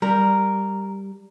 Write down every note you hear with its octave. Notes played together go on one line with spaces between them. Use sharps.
G3 A#4